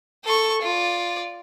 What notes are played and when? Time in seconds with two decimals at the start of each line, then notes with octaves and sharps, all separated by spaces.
0.25 A4 C#6
0.62 F4 D5